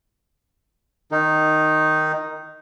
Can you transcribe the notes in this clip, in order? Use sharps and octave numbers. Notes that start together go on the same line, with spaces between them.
D#3 D#4